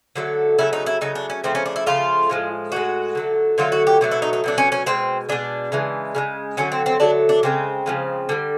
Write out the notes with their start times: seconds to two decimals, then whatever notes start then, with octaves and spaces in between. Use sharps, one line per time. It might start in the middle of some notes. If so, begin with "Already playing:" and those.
0.16 D3 F#3 A3
0.58 C#3 F#3 A3 E4
0.73 D#4
0.86 E4
1.01 C#3 F#3 A3 D#4
1.15 D4
1.30 C#4
1.44 C#3 F3 A3 C4
1.55 C#4
1.66 D4
1.76 E4
1.86 C#3 F3 A3 F4
2.30 A2 F3 G#3
2.72 A2 F3 G#3 F#4
3.15 D3 F#3 A3
3.58 D3 F#3 A3 F4
3.72 F#4
3.87 G4
4.01 B2 F#3 A3
4.11 E4
4.22 D#4
4.33 D#4
4.44 B2 F#3 A3 D4
4.58 C#4
4.72 C#4
4.86 B2 G#3 C4
5.29 B2 G#3 D4
5.72 C#3 E3 G#3
6.15 C#3 E3 G#3
6.57 D3 F#3 A3 C#4
6.72 C4
6.86 C4
7.00 D3 F#3 A3 D4
7.29 D4
7.43 C#3 F3 G#3 C4
7.86 C#3 F3 G#3
8.29 D3 G3